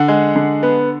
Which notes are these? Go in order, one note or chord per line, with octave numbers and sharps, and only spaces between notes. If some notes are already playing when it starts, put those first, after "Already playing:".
Already playing: D3 F#5
G#3
D3
B3